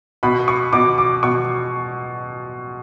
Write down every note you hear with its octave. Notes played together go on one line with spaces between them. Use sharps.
B2 B5
C#6
B2 D6
D6
B2 C#6